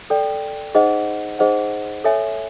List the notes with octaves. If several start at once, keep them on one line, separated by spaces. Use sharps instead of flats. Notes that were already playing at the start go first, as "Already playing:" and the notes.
A4 D5 G5
D#4 G#4 C5 D#5 F#5
D#4 G#4 C5 D#5 F#5
A4 C#5 E5 G#5